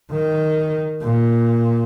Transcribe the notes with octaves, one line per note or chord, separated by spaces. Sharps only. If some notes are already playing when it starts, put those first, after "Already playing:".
D#3
A#2